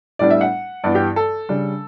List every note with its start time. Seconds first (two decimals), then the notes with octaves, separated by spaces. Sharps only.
0.19 A2 G3 B3 D4 D5
0.30 E5
0.41 F#5
0.84 G2 E3 B3 D5
0.95 G4
1.16 A4
1.49 C#3 G3 D4